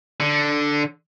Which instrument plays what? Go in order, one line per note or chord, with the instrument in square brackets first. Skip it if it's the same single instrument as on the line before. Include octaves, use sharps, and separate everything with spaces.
[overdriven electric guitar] D3